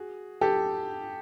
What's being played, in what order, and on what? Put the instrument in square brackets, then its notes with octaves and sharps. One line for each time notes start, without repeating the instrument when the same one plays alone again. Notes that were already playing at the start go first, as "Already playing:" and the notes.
Already playing: [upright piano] F#4 G#4
G4 A4